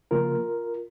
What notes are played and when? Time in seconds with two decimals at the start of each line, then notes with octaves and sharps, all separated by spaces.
0.11 C#3 F3 A#3 F4 A#4